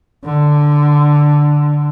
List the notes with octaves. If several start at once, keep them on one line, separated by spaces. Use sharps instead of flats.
D3